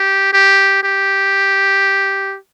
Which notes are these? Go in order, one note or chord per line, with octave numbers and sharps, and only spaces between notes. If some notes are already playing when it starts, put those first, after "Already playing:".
Already playing: G4
G4
G4